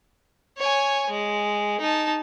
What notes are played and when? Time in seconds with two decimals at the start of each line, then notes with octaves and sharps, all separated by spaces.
0.58 C#5 G#5
1.10 G#3
1.80 D#4 A5